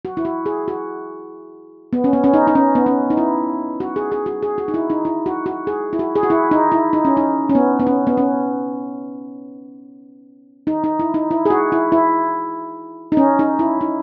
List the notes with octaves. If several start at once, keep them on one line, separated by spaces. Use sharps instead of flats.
F#4
E4
F#4
G#4
F#4
B3
C#4
B3
C#4
D#4
D#4
C#4
B3
C#4
D#4
E4
F#4
G#4
G#4
F#4
G#4
F#4
D#4
E4
D#4
E4
F#4
F#4
G#4
E4
F#4
G#4
F#4
E4
D#4
E4
D#4
C#4
D#4
C#4
B3
B3
C#4
B3
C#4
D#4
D#4
E4
D#4
E4
G#4
F#4
E4
E4
D#4
C#4
D#4
E4
D#4